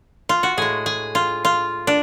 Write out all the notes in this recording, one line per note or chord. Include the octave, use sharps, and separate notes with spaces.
F4
F#4
A2 G#3 G#4
G#4
F4
F4
D4